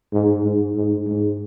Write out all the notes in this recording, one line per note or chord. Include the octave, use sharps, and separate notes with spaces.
G#2
G#2
G#2
G#2